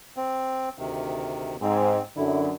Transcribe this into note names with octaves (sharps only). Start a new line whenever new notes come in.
C4
D2 C3 D#3
G#2 C4
F#2 D3 E4